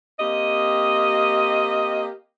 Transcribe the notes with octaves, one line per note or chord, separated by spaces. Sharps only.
A#3 C4 G4 D#5